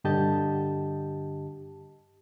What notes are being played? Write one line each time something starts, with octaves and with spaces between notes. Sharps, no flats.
G2 D3 G4 D#5 A5 G6